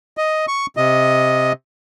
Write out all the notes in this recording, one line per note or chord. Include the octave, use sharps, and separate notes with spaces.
D#5
C#6
C3 D#5